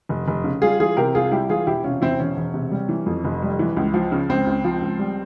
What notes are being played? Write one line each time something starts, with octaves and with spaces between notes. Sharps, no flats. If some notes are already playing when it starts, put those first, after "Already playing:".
F1
F1
C#3
G3 F4 G#4
E3 F4 G#4
C3 G4 A#4
C2 F4 G#4
G3 E4 G4
E3 F4 G#4
E1 E4 G4
C3 C#4 F4
E2 C4 E4
E1 C#4
E1
C3
G3
E3
F2
F1
G3
E3
C#2
F3
C#3
C#2 C4
C#2
F3
C#2
G3